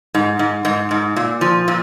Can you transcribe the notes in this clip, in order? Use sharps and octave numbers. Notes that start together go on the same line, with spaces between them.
G#2
G#2
G#2
G#2
A#2
F3
A#2